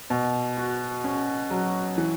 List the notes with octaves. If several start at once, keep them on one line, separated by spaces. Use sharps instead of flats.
B2
F#4
C#4
F#3
E3